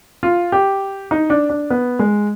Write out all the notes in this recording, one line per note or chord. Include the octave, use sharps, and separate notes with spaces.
F4
G4
D#4
D4
D4
B3
G#3